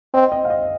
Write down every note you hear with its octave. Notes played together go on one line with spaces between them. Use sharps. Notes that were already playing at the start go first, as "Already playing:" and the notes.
C4 D#5
D#5
F5
D#5